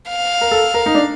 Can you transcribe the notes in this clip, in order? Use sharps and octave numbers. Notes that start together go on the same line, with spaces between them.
F5
A#4
A4
A#4
D#4
D4